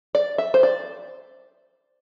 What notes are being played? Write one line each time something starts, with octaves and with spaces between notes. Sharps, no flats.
D5
E5
C5
D5